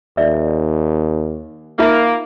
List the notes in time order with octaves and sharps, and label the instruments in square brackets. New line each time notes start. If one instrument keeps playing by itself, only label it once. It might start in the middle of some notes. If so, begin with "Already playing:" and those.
[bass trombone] D#2 [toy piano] D5 E5
[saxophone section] A#3 [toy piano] D#4 F4 E5